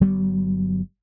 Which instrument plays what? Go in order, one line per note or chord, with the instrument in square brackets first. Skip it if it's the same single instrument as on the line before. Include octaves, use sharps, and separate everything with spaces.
[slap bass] G1 F#3 G3 B3